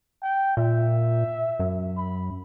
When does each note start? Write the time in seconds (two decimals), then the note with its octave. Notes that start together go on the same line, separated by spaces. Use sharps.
0.22 G5
0.57 A#2 E5
1.59 F#2
1.97 B5